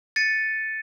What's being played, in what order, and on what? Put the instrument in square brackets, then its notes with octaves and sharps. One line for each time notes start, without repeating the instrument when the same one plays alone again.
[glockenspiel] A6 C#7 D#7